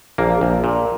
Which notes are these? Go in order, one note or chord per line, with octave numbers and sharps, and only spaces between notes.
A#1 A#3
A#1
A#2